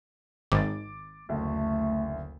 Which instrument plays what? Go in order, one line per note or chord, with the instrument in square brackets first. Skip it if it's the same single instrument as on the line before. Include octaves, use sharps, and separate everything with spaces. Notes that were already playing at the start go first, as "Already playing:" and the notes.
[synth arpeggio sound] G#1 [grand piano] D6 A6
[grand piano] F#1 D2 [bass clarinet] A3